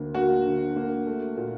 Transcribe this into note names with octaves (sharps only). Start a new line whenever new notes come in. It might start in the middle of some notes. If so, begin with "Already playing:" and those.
Already playing: D2 A#3
A#3 F#4
D3
A#3
A3
A#2